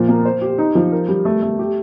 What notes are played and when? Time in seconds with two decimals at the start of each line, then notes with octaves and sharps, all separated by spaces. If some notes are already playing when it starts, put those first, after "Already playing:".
Already playing: A#2 F3
0.08 A#3
0.25 C5
0.41 G4
0.58 D#4
0.75 F3
0.92 A#4
1.08 G3
1.25 A3
1.42 A3
1.59 G4